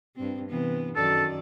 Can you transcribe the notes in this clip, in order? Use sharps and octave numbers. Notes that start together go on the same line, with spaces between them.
G2 C4
C3 E3 B3
F#2 D#3 A4 D5